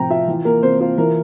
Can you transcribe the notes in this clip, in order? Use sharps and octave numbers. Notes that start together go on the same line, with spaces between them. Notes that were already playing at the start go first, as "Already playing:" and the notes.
Already playing: A2 C3 F3 C4 G5 A#5
F4 E5
E3
A#3 A#4
C3 C5
F4 C5
E3 A#4